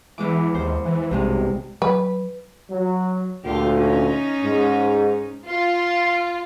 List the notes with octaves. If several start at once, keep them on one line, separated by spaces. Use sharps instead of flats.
E2 E3 G#3 D6
D#2 C5
E3
B1 G2 C3 G#3
F#3 B4
F#3
D2 A#2 F4 G4
C#4 D#4
G#2
F4 C6